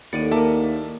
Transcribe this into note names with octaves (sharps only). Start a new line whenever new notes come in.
D#2 A2 D5 F#5 B5 C#7 D#7
A#3 E5 A5 D6